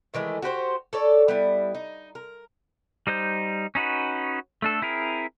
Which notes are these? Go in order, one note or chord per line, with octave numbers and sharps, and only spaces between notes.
D#3 E3 G#3 A3
F#4 G4 B4 C5
A4 C#5 D5
G3 B3 E4
D#4
A#4
G3 D#4 C5 G6
C#4 D#4 F#4 B4
A3 D4 A4
C4 E4 G#4 A#4